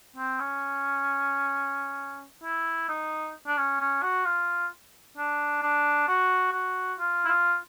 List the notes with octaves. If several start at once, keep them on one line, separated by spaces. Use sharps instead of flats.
C4
C#4
E4
D#4
D4
C#4
C#4
F#4
F4
D4
D4
F#4
F#4
F4
E4
F4